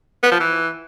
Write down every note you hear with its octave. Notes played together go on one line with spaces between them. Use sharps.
B3
F3
E3